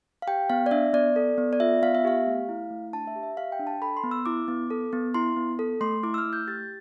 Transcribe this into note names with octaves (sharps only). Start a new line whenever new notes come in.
F5
G4 G5
B3 F5
D5
D4 E5
B3 D5
A4
B3
D5
F4 E5
B3 F5
E5
G4 F5
A3
E4
A3
D4 A5
E5
G4
E5
G4 F5
G5
D4
A5
A4 B5
C6
B3
E6
E4 D6
B3
A4
B3
E4 C6
B3
A4
A3 C6
E4 D6
E6
F6
A3
G6
G4 A6